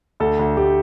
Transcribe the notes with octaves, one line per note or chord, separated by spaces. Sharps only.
D2 A4
D2
D2 G4